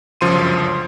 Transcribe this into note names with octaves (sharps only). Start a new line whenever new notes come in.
G1 C#2 F#2 F3 C6 D#7